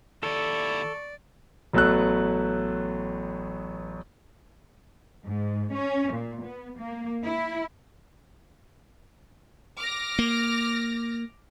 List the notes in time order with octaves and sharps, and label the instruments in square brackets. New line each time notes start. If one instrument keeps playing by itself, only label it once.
[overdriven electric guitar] D#2 E4 [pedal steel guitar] A4 [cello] D5 [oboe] C#6
[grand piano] A1 F#3 A3 B3 E6 F#6
[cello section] G#2
C#4
A#2
B3
A#3
E4
[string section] D6 F6 A#6
[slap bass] A#3